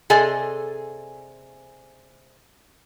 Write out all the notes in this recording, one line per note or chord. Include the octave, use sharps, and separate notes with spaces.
C3 G#4 A4 D5 D#5 G#5